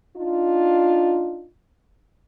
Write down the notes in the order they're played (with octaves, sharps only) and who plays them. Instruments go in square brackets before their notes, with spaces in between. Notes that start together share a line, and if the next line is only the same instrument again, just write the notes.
[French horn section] D4 D#4 F4